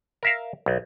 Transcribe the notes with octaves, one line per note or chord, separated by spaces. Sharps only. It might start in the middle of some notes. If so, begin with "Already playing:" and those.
A#4 E5 F5
B1